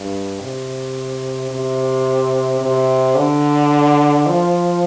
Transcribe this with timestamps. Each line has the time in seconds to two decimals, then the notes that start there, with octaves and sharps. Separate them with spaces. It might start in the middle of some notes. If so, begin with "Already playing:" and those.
Already playing: G2
0.41 C3
1.50 C3
2.61 C3
3.16 D3
4.27 F3